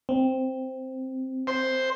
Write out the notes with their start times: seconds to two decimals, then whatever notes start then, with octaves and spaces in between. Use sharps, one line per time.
0.09 C4
1.47 C5